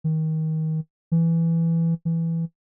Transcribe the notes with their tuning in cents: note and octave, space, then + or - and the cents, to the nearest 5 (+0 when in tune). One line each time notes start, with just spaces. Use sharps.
D#3 +25
E3 +10
E3 +5